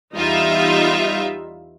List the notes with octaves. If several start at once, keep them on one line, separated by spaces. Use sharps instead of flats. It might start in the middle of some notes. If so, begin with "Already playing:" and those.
E2 G3 D#4 F4 E5